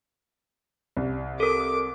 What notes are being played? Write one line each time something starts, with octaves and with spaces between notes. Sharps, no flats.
C2
A4 A#4 D6